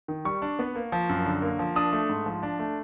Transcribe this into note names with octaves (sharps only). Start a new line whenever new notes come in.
D#3
G3 C#6
D4
B3
A#3
F3
F#2
D3
A#3
F3
D4 D#6
A3
G#2
F3
D4
A3